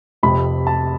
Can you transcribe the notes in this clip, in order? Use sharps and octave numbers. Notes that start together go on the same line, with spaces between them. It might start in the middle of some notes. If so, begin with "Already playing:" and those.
F1 F2 C3 B5
A5